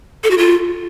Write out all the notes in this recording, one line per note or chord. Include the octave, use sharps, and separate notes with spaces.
A4
F#4
F4